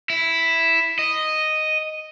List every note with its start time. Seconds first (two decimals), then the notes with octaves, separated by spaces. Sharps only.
0.10 E4
0.99 D#5